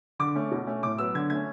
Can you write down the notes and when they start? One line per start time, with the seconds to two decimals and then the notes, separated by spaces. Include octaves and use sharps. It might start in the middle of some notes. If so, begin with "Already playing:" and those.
0.19 D3 D6
0.35 A3 C#4
0.51 B2
0.67 A3 C#4
0.83 A2 D6
0.98 F#3 B3 E6
1.14 D3 G#6
1.30 A3 C#4 G#6